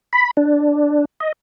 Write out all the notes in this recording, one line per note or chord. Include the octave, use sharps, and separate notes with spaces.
B5
D4
D#5